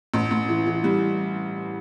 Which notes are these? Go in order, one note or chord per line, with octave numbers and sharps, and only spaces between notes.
A1
A1
E3
E3
G3